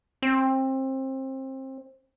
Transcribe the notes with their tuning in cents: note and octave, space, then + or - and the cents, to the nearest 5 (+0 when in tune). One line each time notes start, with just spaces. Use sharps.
C4 +25